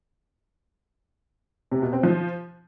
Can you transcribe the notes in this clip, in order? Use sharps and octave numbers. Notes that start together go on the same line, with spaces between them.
C3
B2
C4
F3